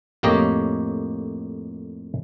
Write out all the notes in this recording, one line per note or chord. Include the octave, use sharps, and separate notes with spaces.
F2 A2 A#3 G4 C#5 D#5